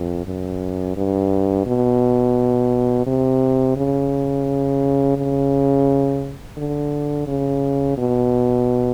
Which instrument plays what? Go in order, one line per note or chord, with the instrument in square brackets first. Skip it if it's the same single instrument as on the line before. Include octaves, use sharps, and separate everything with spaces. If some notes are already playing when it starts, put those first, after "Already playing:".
Already playing: [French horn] F2
F#2
G2
B2
C3
C#3
C#3
D3
C#3
B2